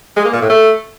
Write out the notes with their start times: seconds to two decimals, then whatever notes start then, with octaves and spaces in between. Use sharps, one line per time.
0.16 G#3
0.25 A#3
0.33 A#2
0.42 A2
0.50 A3